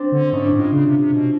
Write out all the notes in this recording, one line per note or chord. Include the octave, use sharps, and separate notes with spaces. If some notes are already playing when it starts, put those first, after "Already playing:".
Already playing: C4 D4
D3
G#2 C#4 D#4
D4 E4
A2
D#4 F4
C#3
C3
C3
B2